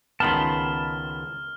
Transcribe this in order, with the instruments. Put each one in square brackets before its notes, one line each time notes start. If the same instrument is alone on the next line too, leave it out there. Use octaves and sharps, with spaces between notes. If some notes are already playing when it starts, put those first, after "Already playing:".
[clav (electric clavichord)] C#2 D#3 B3 [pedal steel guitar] A5 B5 C6 [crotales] F6